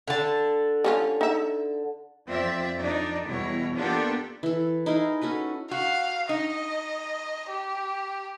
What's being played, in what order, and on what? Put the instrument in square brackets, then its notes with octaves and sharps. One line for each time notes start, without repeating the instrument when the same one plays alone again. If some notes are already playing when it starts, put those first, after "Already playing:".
[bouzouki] D3 A5
[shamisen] G3 C#4 F4
D#4 E5
[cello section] F2 C4 F4 D5 E5
F2 D4 D#4 D5
E2 B2 G3 E4 C#5
A#3 B3 D4 F4 G4 A4
[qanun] E3 A4
D#4 E4 G#4 A#4
C#4 F#4 A4 B4
[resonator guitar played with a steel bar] F#4 [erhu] F5
[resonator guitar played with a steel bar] D#4 [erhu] D#5
[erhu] G4